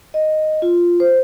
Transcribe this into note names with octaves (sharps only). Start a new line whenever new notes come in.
D#5
F4
C5